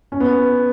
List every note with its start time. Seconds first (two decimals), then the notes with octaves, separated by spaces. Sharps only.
0.12 C#4
0.20 B3